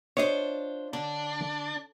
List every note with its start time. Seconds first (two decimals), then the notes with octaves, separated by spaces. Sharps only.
0.17 D4 F4 C5 C#5 D#5
0.93 D3 D4